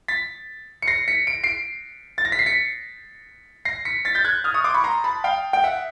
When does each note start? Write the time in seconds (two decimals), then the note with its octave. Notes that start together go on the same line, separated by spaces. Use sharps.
0.08 A6 B6
0.82 C#7
0.88 A#6 C7
1.08 B6 C#7
1.27 D7
1.43 C7 D7
2.18 A6
2.25 A#6
2.32 B6
2.39 C7
2.46 B6 C#7
3.65 A#6 C7
3.85 B6 C#7
4.05 A6 B6
4.15 G6 A6
4.24 F#6 G#6
4.44 D#6 F6
4.54 C#6 D#6
4.64 C6 D6
4.74 B5 C#6
4.84 A#5 C6
5.04 A5 B5
5.24 F5 G5
5.53 G5
5.64 E5 F#5